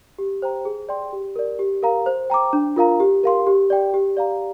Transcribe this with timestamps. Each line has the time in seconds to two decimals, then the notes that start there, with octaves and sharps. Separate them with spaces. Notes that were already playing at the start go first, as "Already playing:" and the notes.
0.19 G4
0.42 C5 G5 A#5
0.65 G#4
0.89 D5 G5 C6
1.13 G4
1.36 A#4 D5
1.59 G4
1.83 A#4 F5 A#5
2.06 C5
2.30 G5 A#5 D6
2.53 D4
2.76 F4 A#4 F5 A#5
3.00 G4
3.23 A#4 F5 C6
3.47 G4
3.70 D5 G5
3.94 G4
4.17 D5 F5 A#5